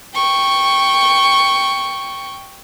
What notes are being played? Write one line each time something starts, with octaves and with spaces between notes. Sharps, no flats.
G5 C#6